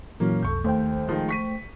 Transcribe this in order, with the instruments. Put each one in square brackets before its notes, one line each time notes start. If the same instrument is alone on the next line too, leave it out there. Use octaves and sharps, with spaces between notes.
[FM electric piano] A#2 E3 F#3 [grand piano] A#3 C#4
[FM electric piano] B1 F2 [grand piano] A4 C#6 G6
[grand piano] D#2 [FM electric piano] A3 C5 G5
[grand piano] D#3 F3 G#3
C#6 B6 D#7